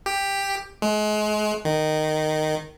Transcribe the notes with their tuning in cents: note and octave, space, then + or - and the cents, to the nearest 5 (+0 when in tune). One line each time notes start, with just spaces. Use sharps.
G4 +10
G#3 +35
D#3 -10